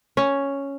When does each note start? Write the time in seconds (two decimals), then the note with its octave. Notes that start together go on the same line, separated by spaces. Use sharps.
0.17 C#4